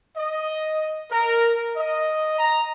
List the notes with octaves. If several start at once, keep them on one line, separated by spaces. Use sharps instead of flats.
D#5
A#4
D#5
A#5